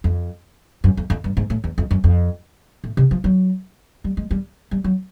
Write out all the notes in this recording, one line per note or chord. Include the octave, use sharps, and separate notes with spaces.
F2
F#2
F2
F2
G2
G#2
A2
E2
F2
F#2
F2
A2
C3
F3
F#3
G3
G#3
G3
G3
F#3